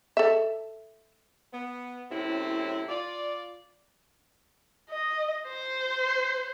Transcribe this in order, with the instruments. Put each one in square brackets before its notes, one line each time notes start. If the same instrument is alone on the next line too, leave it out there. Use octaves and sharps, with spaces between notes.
[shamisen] A4 E5
[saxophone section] B3
F#2 A2 C3 C4 C#4 E4
F4 D5
[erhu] D#5
C5